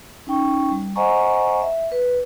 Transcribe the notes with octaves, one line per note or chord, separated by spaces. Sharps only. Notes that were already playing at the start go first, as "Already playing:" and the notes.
C#4 D#4 G5 C#6
G3
C5 D#5 F#5 G#5 A#5 C#6
E5
B4